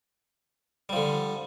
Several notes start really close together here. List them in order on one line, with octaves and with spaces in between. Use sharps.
G3 F3 D3